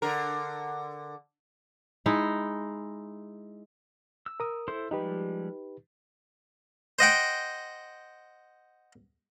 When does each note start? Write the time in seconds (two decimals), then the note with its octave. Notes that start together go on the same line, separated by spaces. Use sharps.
0.02 D3 A#4
2.06 G#3 D#4 E4
4.26 E6
4.40 A#4 D#6
4.68 E4 A4 C5 C6
4.91 F3 G3 G#3 D#4 G4 B4
6.99 C5 D#5 F#5 G5